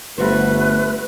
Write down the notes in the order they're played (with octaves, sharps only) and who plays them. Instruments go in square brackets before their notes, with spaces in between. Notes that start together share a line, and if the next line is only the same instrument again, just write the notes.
[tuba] G1 [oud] G3 F#4 C5 [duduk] A3 [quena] B4